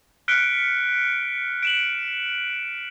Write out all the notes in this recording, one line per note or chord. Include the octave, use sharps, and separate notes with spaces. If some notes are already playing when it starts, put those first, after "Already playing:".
F6 F#6 B6 C#7 D7 G7
D7 E7 F#7